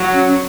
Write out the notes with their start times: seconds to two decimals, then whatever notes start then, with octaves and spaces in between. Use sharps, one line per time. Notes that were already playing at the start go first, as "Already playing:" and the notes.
Already playing: F#3
0.13 C#4